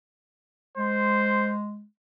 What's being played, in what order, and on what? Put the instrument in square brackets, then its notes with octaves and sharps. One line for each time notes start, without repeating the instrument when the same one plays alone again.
[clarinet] G#3 [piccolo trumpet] C5